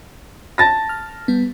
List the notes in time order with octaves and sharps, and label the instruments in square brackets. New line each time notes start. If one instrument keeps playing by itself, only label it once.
[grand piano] A5 A6 A#6
[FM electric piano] F6
G3 B3